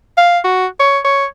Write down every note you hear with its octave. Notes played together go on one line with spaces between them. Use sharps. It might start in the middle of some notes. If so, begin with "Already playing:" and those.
F5
F#4
C#5
C#5